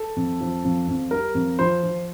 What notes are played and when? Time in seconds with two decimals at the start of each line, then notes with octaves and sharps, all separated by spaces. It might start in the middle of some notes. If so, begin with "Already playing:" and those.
Already playing: A4
0.16 F2
0.41 F3
0.64 F2
0.88 F2
1.11 G3 A#4
1.35 F2
1.59 F3 C5
1.83 F3